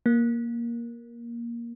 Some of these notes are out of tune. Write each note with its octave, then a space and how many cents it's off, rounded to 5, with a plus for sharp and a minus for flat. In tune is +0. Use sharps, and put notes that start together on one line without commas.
A#3 +10